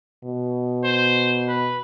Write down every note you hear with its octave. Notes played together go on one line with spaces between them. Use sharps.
B2
C5
B4